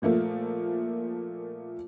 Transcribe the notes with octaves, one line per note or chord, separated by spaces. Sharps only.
A#2 F3 A3 A#3